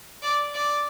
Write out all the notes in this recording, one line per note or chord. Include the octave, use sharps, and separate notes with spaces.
D5
D5